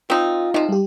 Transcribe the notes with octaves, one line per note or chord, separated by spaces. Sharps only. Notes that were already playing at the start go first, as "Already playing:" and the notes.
C4 D#4 F4
C3 F3 D#4
G3 G4